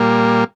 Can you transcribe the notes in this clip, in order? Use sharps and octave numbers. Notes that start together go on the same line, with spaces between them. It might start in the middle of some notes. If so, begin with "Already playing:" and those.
Already playing: A#2 G3 A#3